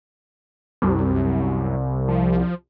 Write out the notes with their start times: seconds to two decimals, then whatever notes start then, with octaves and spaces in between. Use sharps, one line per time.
0.82 C2 F#2
2.08 F3